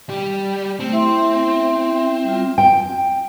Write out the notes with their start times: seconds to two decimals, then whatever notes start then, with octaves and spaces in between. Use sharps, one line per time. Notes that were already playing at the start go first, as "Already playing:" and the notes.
0.09 G3 G4
0.79 A3 C4
0.92 E4 E5 C6
2.24 G3 F4
2.58 G5